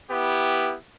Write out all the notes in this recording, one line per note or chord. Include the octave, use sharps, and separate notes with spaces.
B3 E4 G4